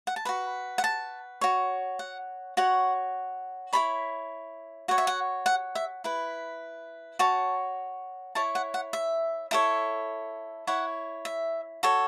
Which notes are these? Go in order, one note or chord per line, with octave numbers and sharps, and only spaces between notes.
F#5
A5
F#4 B4 B5
F#5
A5
F#4 C#5
F#5
F#4 C#5 F#5
E4 A4 C#5 B5
F#4 C#5 F#5
E5
F#5
F#5
E5
E4 B4
F#4 C#5 A5
E4 C#5 A5
F#5
F#5
E5
E4 A4 C#5
E4 C#5 F#5
E5
F#4 A4 C#5